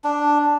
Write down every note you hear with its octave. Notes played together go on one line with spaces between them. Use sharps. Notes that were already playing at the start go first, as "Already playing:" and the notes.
D4